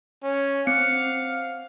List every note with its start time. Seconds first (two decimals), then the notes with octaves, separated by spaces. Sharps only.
0.23 C#4
0.67 C4 F5 C#7